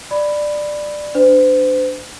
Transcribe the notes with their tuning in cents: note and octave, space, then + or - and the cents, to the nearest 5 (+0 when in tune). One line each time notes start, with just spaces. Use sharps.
D5 +15 B5 +5
D4 +0 C5 -40